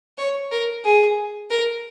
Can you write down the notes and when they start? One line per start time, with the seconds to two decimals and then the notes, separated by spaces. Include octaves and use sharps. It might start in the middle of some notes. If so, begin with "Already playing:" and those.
0.18 C#5
0.51 A#4
0.84 G#4
1.50 A#4